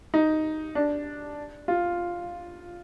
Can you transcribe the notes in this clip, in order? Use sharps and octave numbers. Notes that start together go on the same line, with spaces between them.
D#4
D4
F4